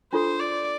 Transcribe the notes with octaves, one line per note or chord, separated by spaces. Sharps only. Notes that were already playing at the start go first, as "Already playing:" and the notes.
D4 F4 A4 C5
D5